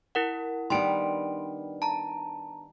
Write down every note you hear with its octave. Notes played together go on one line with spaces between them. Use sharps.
E4 A#4 F#5
D#3 G3 B3 D4 C6 D7
A5 A#5